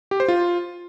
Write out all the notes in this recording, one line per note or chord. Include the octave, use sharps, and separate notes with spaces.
G4
C5
F4